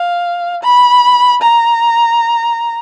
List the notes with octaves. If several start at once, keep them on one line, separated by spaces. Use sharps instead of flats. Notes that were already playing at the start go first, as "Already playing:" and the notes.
Already playing: F5
B5
A#5